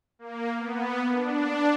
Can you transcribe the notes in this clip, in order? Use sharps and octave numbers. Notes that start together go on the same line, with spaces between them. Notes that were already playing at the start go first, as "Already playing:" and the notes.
A#3
B3
D4